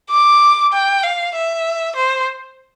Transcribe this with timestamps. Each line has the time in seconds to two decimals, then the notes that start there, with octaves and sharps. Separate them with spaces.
0.11 D6
0.73 G5
1.03 F5
1.35 E5
1.96 C5